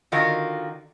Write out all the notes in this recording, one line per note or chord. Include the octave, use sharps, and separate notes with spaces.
D3 D#3 F4 F#4 A#4